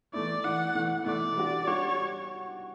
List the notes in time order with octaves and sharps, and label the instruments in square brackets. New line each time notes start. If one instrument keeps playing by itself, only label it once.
[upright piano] E3 A3 E4 [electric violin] D5
[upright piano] E3 A3 E4 [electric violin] F#5
[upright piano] E3 A3 E4
[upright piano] E3 A3 E4 [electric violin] D5
[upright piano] G3 D4 F#4
[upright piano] G3 D4 F#4 [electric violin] C#5